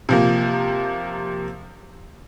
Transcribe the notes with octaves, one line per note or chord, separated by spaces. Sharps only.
C3 F3 A#3